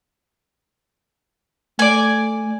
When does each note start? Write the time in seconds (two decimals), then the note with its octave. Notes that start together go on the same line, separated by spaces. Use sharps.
1.79 A3 D5 G#5